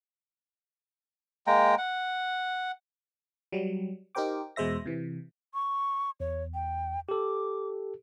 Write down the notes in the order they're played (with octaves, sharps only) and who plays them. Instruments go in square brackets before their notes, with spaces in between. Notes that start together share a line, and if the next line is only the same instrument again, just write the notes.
[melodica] G#3 A#3 G5 A#5
F#5
[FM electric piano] F#3 G3
D#4 G4 A#4 C5 G5 D6
E2 B2 G#3 C5 E5 A#6
C3 E3
[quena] C#6
[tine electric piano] E2 [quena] C#5
[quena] G5
[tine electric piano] G4 A4 [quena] D6